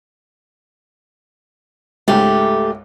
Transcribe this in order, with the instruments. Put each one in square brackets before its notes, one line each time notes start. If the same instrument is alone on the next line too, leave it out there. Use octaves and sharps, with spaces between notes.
[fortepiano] C#2 G#2 [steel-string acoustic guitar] A3 G4